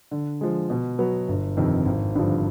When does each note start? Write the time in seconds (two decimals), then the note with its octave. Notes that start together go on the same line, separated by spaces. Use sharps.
0.11 D3
0.41 F3 G#3
0.70 B2
0.99 F#3 B3
1.28 G1
1.57 F2 C3 D#3
1.85 G#1
2.15 G2 D3 F3